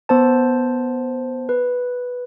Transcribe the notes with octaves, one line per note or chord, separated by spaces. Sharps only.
B3 C5 A5
B4